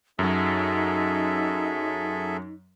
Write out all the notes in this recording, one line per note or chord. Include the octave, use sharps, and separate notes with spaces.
F#2 F#3 D#4 G#4 A4 E5